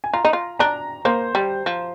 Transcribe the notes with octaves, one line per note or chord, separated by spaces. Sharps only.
G#5
F4 A#5
D#4
F4
D4 A#5
A#3 C5
G3
F3